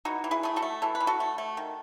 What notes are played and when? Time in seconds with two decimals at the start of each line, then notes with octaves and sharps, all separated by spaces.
0.05 E3 D#4 F#4
0.24 E3
0.31 E4 G#4
0.43 A3 G#4
0.56 F#4 A4
0.62 A3
0.82 E3 A4
0.95 B4
1.00 E3
1.07 F#4 A4
1.20 A3
1.38 A3
1.57 D#3